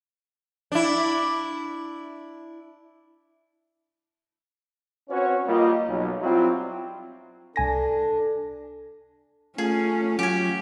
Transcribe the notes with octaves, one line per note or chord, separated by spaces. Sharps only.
D4 E4
C4 C#4 F#4 B4 C#5
G3 A#3 F4 D#5
B1 F#3
F#3 G3 C4 E4 F4
C2 D4 A4 G#5 A#6
A3 C#4 F4 G#4
F#3 F4 G4 G#5